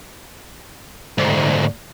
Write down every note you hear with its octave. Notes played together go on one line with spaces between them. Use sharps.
D2 G#2